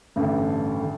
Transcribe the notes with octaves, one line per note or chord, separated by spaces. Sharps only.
A1 G2 D3
D3